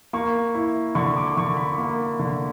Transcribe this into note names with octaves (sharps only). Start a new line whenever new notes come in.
A#3 C#6
E4
D3 C#6
D6
D3 C#6
B5
A#3
D3